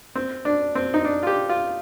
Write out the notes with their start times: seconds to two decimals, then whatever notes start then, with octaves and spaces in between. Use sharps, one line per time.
0.15 C4
0.45 D4
0.75 C4
0.94 D#4
1.05 D4
1.23 F4
1.27 G4
1.49 F4